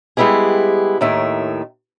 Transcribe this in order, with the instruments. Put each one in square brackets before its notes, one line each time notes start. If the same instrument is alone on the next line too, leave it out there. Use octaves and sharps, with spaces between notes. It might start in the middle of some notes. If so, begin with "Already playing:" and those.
[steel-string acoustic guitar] G3 G#3 B3 E4 G4 G#4
D#2 A2 D#3 E5